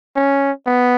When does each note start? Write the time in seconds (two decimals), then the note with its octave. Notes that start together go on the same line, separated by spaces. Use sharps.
0.16 C#4
0.66 B3